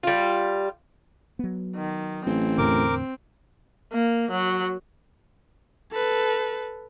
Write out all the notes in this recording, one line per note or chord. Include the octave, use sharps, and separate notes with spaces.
G3 F4
F#3 B3
D#3
A1 C4
E2 A2 D3 A#4 D6
A#3
F#3
A4 B4